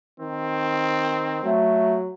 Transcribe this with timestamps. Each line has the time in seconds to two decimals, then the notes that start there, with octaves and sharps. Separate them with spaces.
0.20 D#3 C4
1.43 F#3 A3